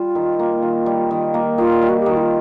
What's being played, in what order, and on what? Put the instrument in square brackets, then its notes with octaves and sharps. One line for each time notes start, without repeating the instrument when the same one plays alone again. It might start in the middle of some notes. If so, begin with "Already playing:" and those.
Already playing: [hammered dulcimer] G3 [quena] F4
[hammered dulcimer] D#3
A#3
D#3
G3
D#3
A#3
[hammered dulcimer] D#3 [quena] F4
[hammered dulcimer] G3
[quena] F#4
G4
[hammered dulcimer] D#3 [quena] F#4
[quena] E4
F4